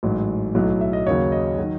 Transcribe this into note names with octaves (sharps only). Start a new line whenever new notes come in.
A1 G#2 F#3
B1 A2 F#3
E5
D#5
D#2 C#3 F#3 C#5
D#5
D#3 F#3